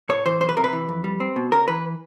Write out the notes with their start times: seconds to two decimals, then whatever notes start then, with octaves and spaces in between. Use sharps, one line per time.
0.09 A2 C#5
0.26 E3 C5
0.41 B1 C5
0.49 B4
0.57 C3 A#4
0.64 B4
0.73 E3
0.89 F2
1.04 G3
1.20 C4
1.36 B2
1.52 C#3 A#4
1.68 E3 B4